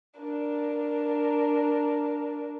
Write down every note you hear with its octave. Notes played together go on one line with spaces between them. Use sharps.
D4 A#4